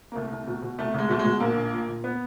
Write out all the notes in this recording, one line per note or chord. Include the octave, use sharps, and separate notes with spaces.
A#3
C2 A3
C2
B2
B2
C2 A3
C2 G#3
B2 A3
G#3
B2
A#1 A#3
A#1
A#2
A#2
B3